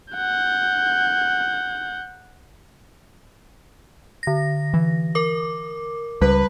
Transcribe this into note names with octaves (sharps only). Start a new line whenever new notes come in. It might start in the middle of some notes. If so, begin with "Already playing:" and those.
F#5 G6
D3 A#6
E3
A#4 D6
C#2 G3 B4